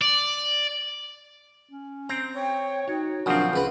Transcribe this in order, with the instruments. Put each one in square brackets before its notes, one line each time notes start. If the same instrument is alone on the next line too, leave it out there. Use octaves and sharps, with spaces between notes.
[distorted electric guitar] D5
[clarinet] C#4
[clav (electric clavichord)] C4 [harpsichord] A#5
[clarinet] C#5 [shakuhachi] G5
[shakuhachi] D#4 [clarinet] F#4 [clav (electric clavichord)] C#5
[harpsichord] A#2 F#3 [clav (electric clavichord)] C#3 F3 C4 [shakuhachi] D4
[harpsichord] C#2 B4 B5 [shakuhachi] C#4